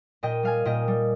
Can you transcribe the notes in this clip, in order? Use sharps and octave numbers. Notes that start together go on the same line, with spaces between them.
A#2 D#5 G5
G3 F5 G#5
A#2 D#5 G5
G3